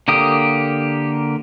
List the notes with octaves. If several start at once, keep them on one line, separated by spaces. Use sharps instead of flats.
D3 A#3 G4 D#6